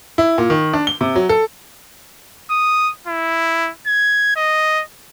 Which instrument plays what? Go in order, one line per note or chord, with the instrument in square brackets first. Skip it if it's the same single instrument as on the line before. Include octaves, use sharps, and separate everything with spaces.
[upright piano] E4
A#2
D#3
D4
G7
C3
F#3
A4
[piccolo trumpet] D#6
E4
G#6
D#5